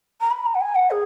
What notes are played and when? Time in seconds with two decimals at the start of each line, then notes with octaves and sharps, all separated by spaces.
0.21 A#5
0.31 B5
0.45 A#5
0.54 F#5
0.60 G#5
0.75 F#5
0.90 G#4